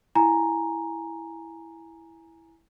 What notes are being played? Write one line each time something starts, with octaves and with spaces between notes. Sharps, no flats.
E4 G#5 A#5